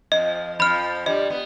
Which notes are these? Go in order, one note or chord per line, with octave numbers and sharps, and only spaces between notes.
F2 F3 D#5
F2 F3 B5 F6
G2 G3 D#5
B3